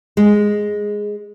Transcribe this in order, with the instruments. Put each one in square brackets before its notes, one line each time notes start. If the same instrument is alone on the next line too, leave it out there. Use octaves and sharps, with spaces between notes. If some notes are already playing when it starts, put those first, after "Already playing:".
[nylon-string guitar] G#3